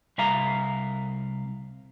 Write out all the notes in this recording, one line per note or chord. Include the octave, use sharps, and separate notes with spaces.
C2 E5 F5 A#5